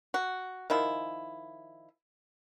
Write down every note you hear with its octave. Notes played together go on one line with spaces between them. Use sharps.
F#4
D#3 F3 E4